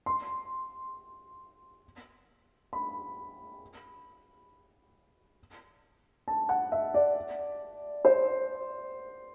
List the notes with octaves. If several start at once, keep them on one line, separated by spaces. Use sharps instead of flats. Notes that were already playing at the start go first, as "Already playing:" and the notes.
C6
B5
A5
F#5
E5
D5
C5